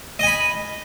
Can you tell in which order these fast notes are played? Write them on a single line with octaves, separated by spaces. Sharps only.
D#5 G#5 B5